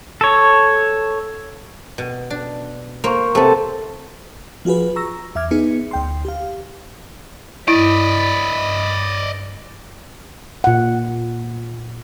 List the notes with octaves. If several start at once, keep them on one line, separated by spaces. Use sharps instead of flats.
A4 C#5
B2
D4
A#3 C5 C#6
C3 A3 B3 A5
F3 F4 F#4 G#4 B4
A#5 C#6 E6 A#6
E2 E5 D6 F6 G#6
B3 D#4 G#4 C#7
D2 G5 C6
G4 F5
G2 E4 D5 D#5 B5
A#2 F#5